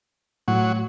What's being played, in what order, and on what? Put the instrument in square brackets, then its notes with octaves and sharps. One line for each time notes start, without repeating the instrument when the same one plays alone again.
[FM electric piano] A2 [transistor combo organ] F#3